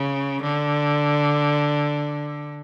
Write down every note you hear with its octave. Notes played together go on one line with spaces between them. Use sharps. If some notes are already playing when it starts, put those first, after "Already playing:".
Already playing: C#3
D3